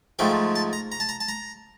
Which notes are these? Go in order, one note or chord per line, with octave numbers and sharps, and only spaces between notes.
G#2 F3 A3 G5
A5
A#5
A#5
A5
A#5
A5
A#5